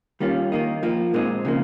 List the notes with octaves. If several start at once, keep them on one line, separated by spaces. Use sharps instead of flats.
D#3 G3 A#3 C#4 F4
D#3 A#3 D#4
F3 A#3 F4
A#2 G#3 C4 D#4
C#3 F3 A#3